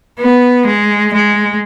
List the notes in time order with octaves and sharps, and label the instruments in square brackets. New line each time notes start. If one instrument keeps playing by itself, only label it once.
[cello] B3
G#3
G#3